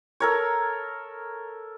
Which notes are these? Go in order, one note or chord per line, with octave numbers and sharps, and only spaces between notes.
A4 A#4 C#5